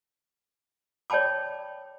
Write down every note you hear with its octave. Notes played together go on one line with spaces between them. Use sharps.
C#5 D5 G5 A5 B5 D6